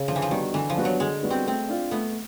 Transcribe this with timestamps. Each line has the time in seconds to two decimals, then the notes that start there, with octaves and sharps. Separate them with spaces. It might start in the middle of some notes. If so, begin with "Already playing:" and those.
Already playing: C#3
0.08 D3 F3
0.16 E3
0.22 F3
0.31 D#3 G3 B3 D4 F#4
0.54 D3 E3
0.70 F3
0.77 G3 B3 D4 F#4
0.85 F#3
1.00 D3 G#3
1.23 G3 B3 D4 F#4
1.30 C4
1.46 A3 C4
1.69 D4 F4
1.91 A3 B3